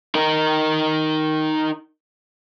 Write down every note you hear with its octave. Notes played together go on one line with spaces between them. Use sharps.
D#4 A#4